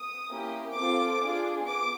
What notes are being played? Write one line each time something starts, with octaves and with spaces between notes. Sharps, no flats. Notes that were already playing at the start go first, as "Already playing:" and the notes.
Already playing: D#6
A#3 C#4 E4 G4
C4 F4 A4 D6
D4 F4 G#4
B3 D6